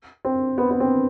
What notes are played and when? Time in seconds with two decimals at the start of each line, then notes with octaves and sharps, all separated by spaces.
0.25 C4
0.58 B3
0.71 B3
0.80 C4